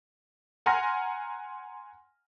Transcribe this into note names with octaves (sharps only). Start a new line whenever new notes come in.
F#5 G#5 A#5 C6 F6 A#6